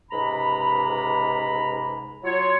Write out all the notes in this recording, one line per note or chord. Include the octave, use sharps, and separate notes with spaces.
C#2 G#2 C3 A#5 B5
F#3 F4 C#5